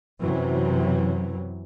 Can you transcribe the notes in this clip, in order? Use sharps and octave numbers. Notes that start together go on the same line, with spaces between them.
F#2 C3 E3 F#3